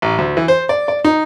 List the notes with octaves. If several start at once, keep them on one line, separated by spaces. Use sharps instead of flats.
A1
D2
E3
C5
D5
D5
D#4